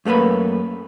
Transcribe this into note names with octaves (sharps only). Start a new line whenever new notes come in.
F#2 A3 A#3 B4 B5